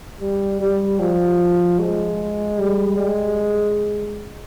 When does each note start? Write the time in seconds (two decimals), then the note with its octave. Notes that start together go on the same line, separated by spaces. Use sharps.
0.20 G3
0.60 G3
1.00 F3
1.79 G#3
2.58 G3
2.98 G#3